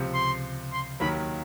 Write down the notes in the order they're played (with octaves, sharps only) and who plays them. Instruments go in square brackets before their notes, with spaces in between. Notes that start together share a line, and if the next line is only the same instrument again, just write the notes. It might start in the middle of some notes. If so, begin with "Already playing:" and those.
Already playing: [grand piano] C#2 C3 F3
[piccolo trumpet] C6
C6
[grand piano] D#2 D#3 F#3 [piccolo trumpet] B5